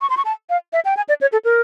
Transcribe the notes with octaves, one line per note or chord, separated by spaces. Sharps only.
C#6
C6
C#6
A5
F5
E5
G5
G#5
D5
C#5
A4
A#4